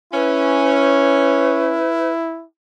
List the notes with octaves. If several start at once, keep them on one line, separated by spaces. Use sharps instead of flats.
C#4 E4 B4